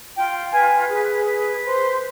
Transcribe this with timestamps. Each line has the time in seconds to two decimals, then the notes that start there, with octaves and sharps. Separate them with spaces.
0.16 F4 G5
0.53 B4 G#5
0.89 G#4
1.26 B4
1.63 C5